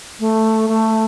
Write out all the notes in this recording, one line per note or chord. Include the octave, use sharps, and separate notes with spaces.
A3
A3